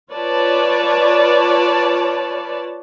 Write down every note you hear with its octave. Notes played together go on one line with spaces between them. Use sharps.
F4 B4 C#5 D5 A5